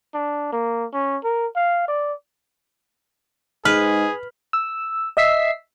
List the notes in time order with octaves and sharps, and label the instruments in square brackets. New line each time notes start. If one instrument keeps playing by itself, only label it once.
[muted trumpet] D4
A#3
C#4
A#4
F5
D5
[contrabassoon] G#2 [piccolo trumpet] G#4 [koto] B4 [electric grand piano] F6
[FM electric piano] E6
D#5 E5 E6 B6 C7